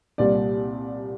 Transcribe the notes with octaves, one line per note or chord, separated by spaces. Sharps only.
C2 A#2 G3 D5